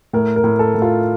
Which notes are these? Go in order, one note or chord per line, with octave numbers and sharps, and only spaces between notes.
A2 A#4
A#4
A2
A4
A2
F4